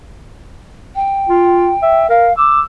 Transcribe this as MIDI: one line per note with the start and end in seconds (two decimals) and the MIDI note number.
0.95 2.06 79
1.29 1.71 65
1.82 2.07 76
2.09 2.29 70
2.09 2.35 77
2.37 2.60 86
2.37 2.62 88